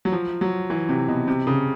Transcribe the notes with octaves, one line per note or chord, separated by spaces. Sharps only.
F#3
F3
F#3
E3
C3
B2
C3
C#3